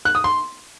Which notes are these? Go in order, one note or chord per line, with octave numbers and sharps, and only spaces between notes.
F#6
D#6
C6